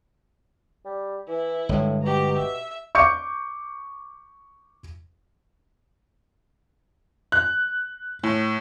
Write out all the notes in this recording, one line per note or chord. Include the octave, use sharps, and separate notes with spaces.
G3
E3 E4
G1 A2 G#3
B2 G4 A#5
E5
C#6 D6 G6 C#7
F#6
A2